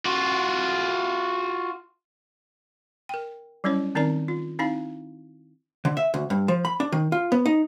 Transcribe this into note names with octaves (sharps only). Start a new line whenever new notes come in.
F4 F#4
A#4 G5
F#3 G3 C#4 E4 C#5
D#3 C4 D#4 A#4 D5 A#5
F4
C4 D#4 E4 F5 B5
D3
E5
D2
G2
F3
B5
D4
D#3
F4
B3
D#4